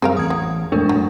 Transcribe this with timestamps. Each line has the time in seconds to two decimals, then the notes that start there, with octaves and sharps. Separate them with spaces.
0.02 F#2 G3 C4 G#4 A#4 F5
0.17 A1 E2 D#6 G#6
0.30 F#3
0.72 F2 A#2 G#3 A3 D4 A#4
0.89 F#2 A2 F#3